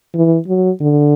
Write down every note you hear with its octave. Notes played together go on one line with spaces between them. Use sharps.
E3
F#3
D3